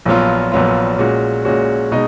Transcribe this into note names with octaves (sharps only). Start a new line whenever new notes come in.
A#1 A#2 F#3 B3 F4
A#1 A#2 F#3 B3 F4
A#2 G#3 C#4 F#4
A#2 G#3 C#4 F#4
B2 G#3 D#4